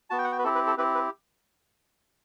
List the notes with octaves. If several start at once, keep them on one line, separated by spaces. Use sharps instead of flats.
B3 F#4 A5
G5
F#5
G5
B4
C4 E4 G4 A4
B4
A4
C4 E4 G4 B4
B4